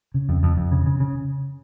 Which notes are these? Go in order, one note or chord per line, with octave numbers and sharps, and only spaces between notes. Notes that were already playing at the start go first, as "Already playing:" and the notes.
C#3
F2
F2
F2
C#3
C#3
C#3